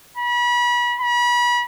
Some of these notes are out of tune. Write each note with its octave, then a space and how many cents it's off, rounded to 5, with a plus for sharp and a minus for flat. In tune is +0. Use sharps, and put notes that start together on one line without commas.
B5 -35
B5 -35